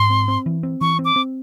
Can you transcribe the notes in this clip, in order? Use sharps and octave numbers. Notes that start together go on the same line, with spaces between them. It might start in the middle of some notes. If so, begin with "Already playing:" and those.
Already playing: G#2 C6
C4
C4
E3
C4
E3 C#6
C4
D6
C4